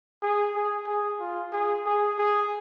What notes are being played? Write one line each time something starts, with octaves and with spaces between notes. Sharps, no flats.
G#4
G#4
G#4
F4
G#4
G#4
G#4